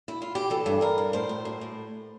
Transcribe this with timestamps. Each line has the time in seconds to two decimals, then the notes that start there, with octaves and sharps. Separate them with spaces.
0.08 E4
0.22 F4
0.35 G4
0.50 E3 A4
0.66 G2
0.81 G2 A#4
0.98 G2
1.13 A2 C5
1.29 A2
1.45 A2
1.61 A2